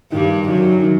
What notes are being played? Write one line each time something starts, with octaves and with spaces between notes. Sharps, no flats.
G2 D#3 G3
F#2 D#3 F#3
D#3